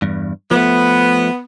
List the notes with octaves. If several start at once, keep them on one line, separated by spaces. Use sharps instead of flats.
E2 G2
F3 A3 B3